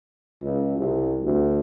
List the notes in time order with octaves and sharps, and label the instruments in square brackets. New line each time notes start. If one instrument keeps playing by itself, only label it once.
[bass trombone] C#2
C2
D2